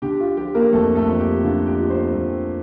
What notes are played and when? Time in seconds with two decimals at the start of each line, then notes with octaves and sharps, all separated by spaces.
0.02 D3 G4
0.20 F4
0.37 F3 G4
0.55 A#3 A#4
0.72 F2 A3 A4
0.95 A3 A4
1.08 F2
1.20 G4
1.44 D3 F4
1.67 G4
1.79 F3
1.90 C4 C5
2.14 F2